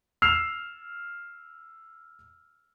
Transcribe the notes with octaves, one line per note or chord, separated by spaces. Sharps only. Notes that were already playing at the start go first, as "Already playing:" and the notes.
E6 F6 C7 F7